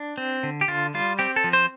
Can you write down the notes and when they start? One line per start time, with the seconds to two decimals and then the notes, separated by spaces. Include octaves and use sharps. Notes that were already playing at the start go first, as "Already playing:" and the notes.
Already playing: D4
0.18 C4
0.43 D3
0.61 G4
0.68 D3 F4
0.94 G3 F4
1.19 C4 G4
1.36 A4
1.44 F3
1.53 C5